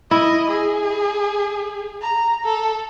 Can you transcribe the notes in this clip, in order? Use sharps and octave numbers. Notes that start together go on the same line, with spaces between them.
E4 D#5
G#4
A#5
A4